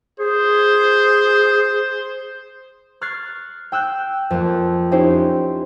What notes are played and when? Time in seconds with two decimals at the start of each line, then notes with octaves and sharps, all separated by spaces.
0.20 G#4 C5
3.01 C#6 F6 F#6 G#6 A6 C7
3.72 G5 E6 F#6 G6
4.30 F2 A#3
4.92 C#4 D#4 E4 G4 C5